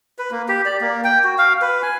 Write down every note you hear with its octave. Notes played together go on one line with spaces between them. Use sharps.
B4
A#3
G4
D5
A#3
G5
F#4
F5
B4
G#5